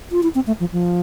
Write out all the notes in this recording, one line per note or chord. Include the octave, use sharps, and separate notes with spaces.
F4
E4
C4
A3
F3
F3